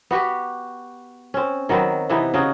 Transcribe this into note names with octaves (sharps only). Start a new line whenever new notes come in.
B3 F#4 G4 B4
C4 C#4
D#3 F#3 B3 C4
C3 E3 B3 D#4
C#3 D#4 F#4